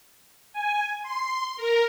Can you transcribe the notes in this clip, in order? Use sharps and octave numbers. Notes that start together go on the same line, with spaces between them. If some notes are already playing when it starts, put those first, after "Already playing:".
G#5
C6
A#4